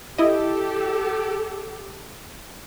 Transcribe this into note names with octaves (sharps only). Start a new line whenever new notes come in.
E4 G4 A4 D#5